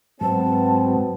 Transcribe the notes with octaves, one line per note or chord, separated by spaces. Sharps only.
G#2 B2 F#3 G#3 B3 C4 A5